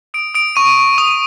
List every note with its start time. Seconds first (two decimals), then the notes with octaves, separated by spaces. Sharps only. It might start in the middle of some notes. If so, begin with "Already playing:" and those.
0.14 D#6 D7
0.35 D#6 D7
0.56 C#6 D#7
0.78 C#6
0.98 D#6 F7